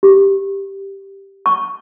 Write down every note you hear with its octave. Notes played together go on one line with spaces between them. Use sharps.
G4
C#6